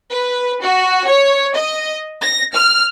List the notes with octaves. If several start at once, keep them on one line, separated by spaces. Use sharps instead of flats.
B4
F#4
C#5
D#5
A#6
F6